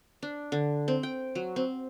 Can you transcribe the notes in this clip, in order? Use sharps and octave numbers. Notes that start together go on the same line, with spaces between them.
D4
D3
C4
G5
F#3
C4